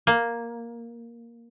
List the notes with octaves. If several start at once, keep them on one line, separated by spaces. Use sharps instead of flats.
A#3